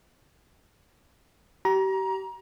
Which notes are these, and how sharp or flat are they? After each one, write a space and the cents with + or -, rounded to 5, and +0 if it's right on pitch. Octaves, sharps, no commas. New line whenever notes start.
G4 -35 A#5 +25